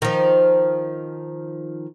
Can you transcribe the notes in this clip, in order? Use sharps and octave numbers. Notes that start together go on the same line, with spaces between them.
D#3 F3